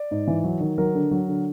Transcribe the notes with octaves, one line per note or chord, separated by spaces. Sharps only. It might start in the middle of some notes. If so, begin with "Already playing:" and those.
Already playing: D5
G#2
E3
F#3
D#3
F#3 A#4
D3
F#3
D3